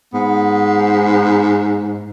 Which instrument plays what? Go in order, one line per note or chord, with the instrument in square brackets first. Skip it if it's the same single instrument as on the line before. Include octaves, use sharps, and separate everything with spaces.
[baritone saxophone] G#2 [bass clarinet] B3